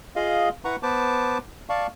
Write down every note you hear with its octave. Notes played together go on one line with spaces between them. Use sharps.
F4 G#4 D#5 F5
E4 B4 F#5 A#5 C#6
B3 B4 C5 A5 D6
D5 F5 A5 C#6